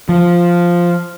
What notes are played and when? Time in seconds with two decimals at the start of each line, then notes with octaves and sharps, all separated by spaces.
0.09 F3